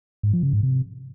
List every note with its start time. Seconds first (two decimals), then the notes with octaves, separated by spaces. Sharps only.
0.23 G#2
0.33 F3
0.43 C#3
0.53 G#2
0.63 C3